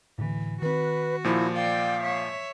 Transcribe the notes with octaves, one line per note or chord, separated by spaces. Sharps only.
A2 D3 E3
D#3 C4 F#4 B4
A#2 F3 E4
D5 F5 G5
C#5 E5